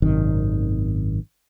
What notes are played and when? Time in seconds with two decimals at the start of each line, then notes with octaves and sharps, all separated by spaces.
0.02 G#1 F#2 C3 D#3